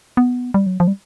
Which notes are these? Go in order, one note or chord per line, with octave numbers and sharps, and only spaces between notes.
B3
G3
F#3
F3
G3